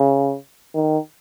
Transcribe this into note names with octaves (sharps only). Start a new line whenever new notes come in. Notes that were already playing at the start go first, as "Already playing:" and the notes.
Already playing: C#3
D#3